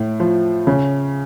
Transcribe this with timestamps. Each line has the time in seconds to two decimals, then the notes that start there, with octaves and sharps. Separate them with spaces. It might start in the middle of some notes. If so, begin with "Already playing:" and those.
Already playing: A2
0.20 F3
0.67 C#3